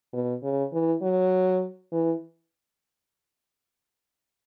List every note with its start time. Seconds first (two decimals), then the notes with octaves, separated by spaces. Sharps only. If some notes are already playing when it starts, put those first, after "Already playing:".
0.13 B2
0.43 C#3
0.73 E3
1.03 F#3
1.92 E3